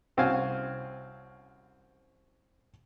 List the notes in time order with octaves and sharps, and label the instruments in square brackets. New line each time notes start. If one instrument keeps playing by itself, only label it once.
[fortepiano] C2 C4 C#4 F#4 F5 G#5